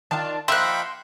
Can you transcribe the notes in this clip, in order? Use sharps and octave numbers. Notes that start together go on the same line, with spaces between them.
D#3 D4 F4 A5
F3 A#3 D#4 E5 F#5 G5 B5 C6